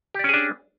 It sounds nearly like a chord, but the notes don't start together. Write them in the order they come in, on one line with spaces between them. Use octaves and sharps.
G4 D5 C#4 G#4 D4